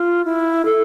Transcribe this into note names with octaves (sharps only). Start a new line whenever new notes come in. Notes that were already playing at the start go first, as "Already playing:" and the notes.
Already playing: F4
E4
A4